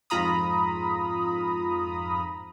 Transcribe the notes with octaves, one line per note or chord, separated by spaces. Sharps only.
F2 G#2 F4 A#5 B5 D#6